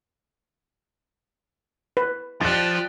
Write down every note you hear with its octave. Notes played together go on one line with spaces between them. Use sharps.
B4
F3 G4 D5 F#6 A6